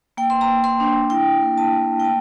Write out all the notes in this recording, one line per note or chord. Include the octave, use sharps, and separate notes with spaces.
A#3 G5
C6
A#5
A#3
C6
D4
E4 G5
A#3
A5
A#3
G5
A3 A5